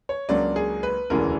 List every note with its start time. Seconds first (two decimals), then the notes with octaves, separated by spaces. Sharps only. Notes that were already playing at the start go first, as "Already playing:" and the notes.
0.09 C#5
0.29 C#2 C#3 F#3 A#3 D4 D5
0.56 G#4
0.83 B4
1.10 E1 D2 C#3 E3 G#3 A#4